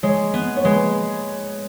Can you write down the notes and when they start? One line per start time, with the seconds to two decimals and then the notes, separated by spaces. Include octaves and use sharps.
0.03 G#3 C#5
0.34 B3
0.57 C#5
0.65 G#3 B4